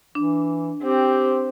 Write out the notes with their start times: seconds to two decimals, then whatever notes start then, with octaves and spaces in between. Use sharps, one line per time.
0.15 E3 D4
0.83 C4 G4